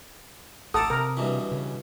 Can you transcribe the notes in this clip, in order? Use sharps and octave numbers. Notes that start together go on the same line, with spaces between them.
A1 A4 F#5 A#5 D6 D#6
C3 A#4
G2 B2 E3
C#3